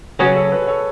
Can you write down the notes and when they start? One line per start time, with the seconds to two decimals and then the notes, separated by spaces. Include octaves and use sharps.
0.19 C#3 F#3 C#4 F#4 G#4 B4
0.36 A4 C#5
0.51 G#4 B4
0.67 A4 C#5